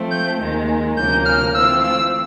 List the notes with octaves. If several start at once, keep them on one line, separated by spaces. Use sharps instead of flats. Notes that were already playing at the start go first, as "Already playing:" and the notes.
Already playing: F3 A3 C4
G6
D#2 D#3 G#3
D2 C3 F3 A#3 C#4 G6
F6
E3 A3 C4 F4 E6
E6